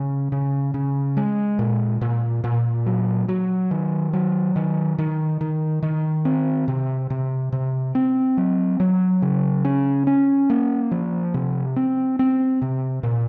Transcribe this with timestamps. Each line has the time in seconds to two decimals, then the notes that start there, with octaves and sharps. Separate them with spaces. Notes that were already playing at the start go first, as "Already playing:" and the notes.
Already playing: C#3
0.32 C#3
0.74 C#3
1.17 G#3
1.59 A#2
2.01 A#2
2.44 A#2
2.86 F#3
3.28 F#3
3.71 D#3
4.13 F#3
4.56 D#3
4.98 D#3
5.41 D#3
5.83 D#3
6.25 C4
6.68 C3
7.10 C3
7.52 C3
7.95 C4
8.37 F#3
8.80 F#3
9.22 C#3
9.65 C#4
10.07 C#4
10.50 A#3
10.91 F3
11.34 C3
11.76 C4
12.19 C4
12.62 C3
13.03 A#2